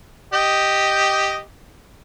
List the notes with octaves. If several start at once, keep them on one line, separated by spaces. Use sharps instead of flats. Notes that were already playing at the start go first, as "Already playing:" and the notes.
G4 D#5 G5